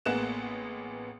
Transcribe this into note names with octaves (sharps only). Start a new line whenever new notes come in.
A1 A#3 B3 G#4 F#6 E7